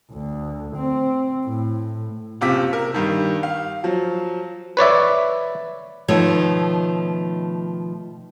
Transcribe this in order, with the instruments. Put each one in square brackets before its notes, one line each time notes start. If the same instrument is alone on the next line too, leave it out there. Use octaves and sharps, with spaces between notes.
[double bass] D2
C4
A2
[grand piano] F#1 C3 F4 D6 E6 B6
A#4
G2 D#3
F5
F3 F#3
[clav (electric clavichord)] B4 C#5 D5 E5
[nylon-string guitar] B2 D#3 F3 A3 C#5